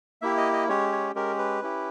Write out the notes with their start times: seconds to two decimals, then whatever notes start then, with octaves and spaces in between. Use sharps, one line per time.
0.22 A#3 E4 G4 E5
0.37 D#5
0.53 D#5
0.68 G#3 C#4 G4 C#5
0.92 C#5
1.15 G#3 C#4 G4 A#4
1.38 B4
1.62 C#4 E4 G4